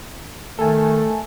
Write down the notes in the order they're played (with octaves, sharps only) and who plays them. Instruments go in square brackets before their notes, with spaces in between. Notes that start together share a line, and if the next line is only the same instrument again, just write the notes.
[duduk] D#3 [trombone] A3 [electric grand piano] A4 [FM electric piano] G#5 A5